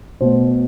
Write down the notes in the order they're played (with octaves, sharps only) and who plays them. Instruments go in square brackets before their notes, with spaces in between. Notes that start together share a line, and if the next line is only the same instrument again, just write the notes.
[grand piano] B2 A3 C5